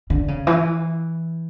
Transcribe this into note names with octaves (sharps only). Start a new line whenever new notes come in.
D3
C#3
E3